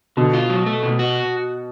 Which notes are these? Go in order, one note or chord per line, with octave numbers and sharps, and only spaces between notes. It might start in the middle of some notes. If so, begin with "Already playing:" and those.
B2 D3
F4
F#3
A3
B2
F#4